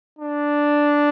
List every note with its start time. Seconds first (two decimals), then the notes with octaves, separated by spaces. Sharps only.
0.19 D4